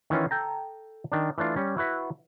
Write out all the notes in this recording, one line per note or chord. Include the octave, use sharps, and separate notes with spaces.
D#3 E3 C#4 F4
A4 G5 A#5
D#3 D4
E3 A3 D4 F4
G3 C#4
E4 F#4 B4 E5